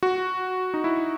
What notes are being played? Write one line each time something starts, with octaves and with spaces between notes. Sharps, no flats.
F#4
D#4
E4